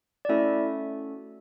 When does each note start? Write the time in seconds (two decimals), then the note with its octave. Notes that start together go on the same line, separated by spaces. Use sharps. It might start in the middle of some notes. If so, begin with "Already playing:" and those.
0.25 D5
0.29 A3 C#4 E4 F#4 A4 E5